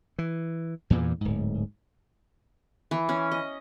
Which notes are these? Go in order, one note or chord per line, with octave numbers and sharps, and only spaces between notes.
E3
E2 G2 A#2 E3
D1 G#2
E3
C#4
D#5